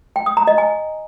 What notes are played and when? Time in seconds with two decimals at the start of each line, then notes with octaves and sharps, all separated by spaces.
0.16 G5
0.26 D#6
0.37 A#5
0.47 D#5
0.58 G#5